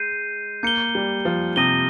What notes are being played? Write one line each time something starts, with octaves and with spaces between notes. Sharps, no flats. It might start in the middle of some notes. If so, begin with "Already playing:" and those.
Already playing: G#3 G6 C7 D#7
A#3 G6 C#7 G7
G3
F3
C3 D#6 A#6 D#7 G7